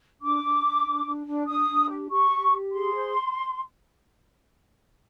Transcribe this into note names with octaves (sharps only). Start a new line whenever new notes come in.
D4 D6
D4
D4
D4
D4
D4
D4 D#6
D4
G4
G4 C#6
G4
G4
G#4 C6
C5